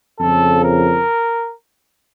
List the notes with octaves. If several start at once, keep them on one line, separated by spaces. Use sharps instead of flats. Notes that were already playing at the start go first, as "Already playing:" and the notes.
F2 C#3 F3 A4
A#4